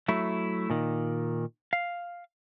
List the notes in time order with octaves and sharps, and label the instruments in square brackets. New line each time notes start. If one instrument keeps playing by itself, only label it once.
[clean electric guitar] F#3 A3 E4
A#2 D#3
F5